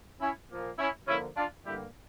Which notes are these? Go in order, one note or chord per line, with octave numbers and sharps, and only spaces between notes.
C#4 E4
A#2 F3 A#3
C#4 E4
D3 F3 A#3 C#4 E4
D4 F4
G2 D3 G3 A#3 E4 G4